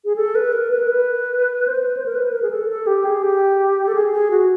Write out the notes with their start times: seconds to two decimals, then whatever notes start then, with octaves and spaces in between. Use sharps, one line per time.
0.05 G#4
0.16 A4
0.35 B4
0.52 A#4
0.71 B4
0.79 A#4
0.88 B4
1.68 C5
1.79 B4
1.97 C5
2.06 A#4
2.15 B4
2.32 A#4
2.42 G#4
2.51 A4
2.68 A4
2.87 G4
3.05 G#4
3.23 G4
3.88 A4
3.95 G#4
4.12 G#4
4.31 F#4